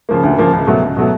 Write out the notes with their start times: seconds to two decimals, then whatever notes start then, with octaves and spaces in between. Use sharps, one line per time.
0.09 C#3 F3 A#3
0.24 D2
0.38 C#3 F3 A#3
0.53 C#2
0.67 B2 F#3 A3
0.82 C#2
0.96 B2 F#3 A3